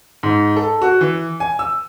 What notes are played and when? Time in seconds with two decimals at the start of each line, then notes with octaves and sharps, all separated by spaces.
0.23 G#2
0.56 A4
0.82 F#4
1.01 E3
1.40 G#5
1.59 E6